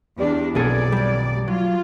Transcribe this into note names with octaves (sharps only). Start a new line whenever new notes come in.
E2 D4 G4 D5
B1 F2 A#2 B3 G#4 A4 D5 G#6
D#2 G3
F#3 F4